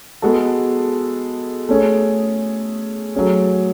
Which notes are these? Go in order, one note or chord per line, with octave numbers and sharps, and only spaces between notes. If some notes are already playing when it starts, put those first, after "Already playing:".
G#3 B3 F#4 A4
A3 C#4 G#4
F#3 A3 C#4 G#4